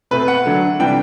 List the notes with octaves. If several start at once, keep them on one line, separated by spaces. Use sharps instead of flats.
B2 A3 C4 B4
F#5
D3 F#3 A3 D4
C3 E3 G3 D4 G5